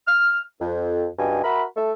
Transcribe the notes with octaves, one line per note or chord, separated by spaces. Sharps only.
F6
F2
C#2 G2 F#4 D#5 G5 G#5
F#4 A#4 E5 B5
A3 A4 E5